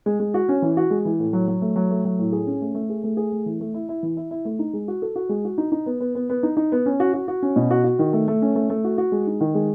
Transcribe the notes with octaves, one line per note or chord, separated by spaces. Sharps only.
G#3
G#3
F#4
C#4
E3
F#4
G#3
E3
A2
F#3
F#3
A3
F#3
A3
F#3
A2
G#4
C#4
A3
A3
G#4
A3
G#4
A3
E3
A3
E4
E4
E3
E4
E4
A3
D#4
G#3
F#4
A4
F#4
G#3
F#4
D#4
D#4
B3
B3
B3
B3
D#4
D#4
B3
C#4
F#4
F#4
F#4
C#4
B2
F#4
F#4
D#3
A3
A3
C#4
A3
A3
F#4
F#4
G#3
D#4
D#3
G#3